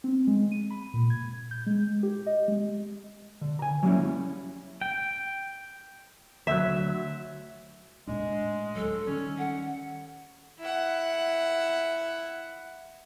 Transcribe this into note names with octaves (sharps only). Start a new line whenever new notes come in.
C4
G#3
D#7
B5
A#2
G#6
G6
G#3
G4
D#5
G#3
D3
G#5 A#5
F#3 G3 A#3 C#4 E4
G5
D2 F#3 E5
A2 G#3 D4
D2 F#3 A4
D#3 G3 C#4
F#5
E4 F#5